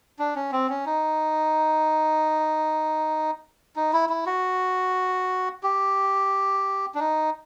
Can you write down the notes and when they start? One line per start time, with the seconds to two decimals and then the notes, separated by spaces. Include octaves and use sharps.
0.19 D4
0.35 C#4
0.52 C4
0.69 C#4
0.86 D#4
3.76 D#4
3.93 E4
4.09 E4
4.26 F#4
5.63 G4
6.95 D4
6.99 D#4